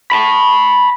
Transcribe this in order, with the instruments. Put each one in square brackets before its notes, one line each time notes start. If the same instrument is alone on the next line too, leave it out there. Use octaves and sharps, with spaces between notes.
[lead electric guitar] A5 B5